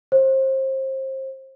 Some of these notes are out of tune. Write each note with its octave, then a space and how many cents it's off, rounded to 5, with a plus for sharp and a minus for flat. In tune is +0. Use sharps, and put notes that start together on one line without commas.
C5 +30